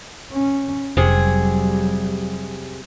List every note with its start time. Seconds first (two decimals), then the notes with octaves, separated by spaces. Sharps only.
0.32 C#4
0.97 F1 C3 F#3 G3 G#4